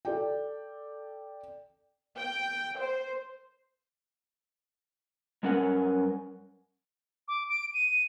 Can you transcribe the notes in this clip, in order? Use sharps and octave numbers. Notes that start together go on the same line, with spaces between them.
A4 D5 G5
G5
C5
F#2 G3 C#4 A#4 B4 F#5
D6
D7
D#7